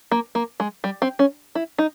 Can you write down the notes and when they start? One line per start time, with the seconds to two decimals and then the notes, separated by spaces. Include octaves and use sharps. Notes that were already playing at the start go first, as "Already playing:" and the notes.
0.12 A#3
0.35 A#3
0.60 G#3
0.84 G3
1.02 C4
1.19 C#4
1.55 E4
1.78 D#4